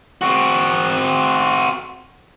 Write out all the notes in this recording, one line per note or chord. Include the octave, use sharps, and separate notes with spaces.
C4 F#4